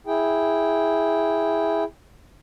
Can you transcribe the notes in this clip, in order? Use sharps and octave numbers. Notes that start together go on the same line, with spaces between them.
E4 G#4 G5